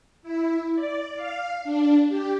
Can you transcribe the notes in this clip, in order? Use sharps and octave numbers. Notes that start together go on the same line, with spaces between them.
E4
D5
F5
D4
G4